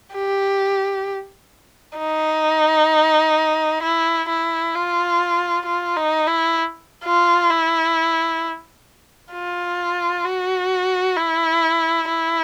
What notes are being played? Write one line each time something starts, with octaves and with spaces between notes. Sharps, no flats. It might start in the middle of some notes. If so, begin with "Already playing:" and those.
G4
D#4
E4
E4
F4
F4
D#4
E4
F4
E4
F4
F#4
E4
E4